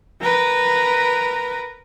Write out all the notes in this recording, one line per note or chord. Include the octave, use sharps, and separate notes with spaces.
A#4 B4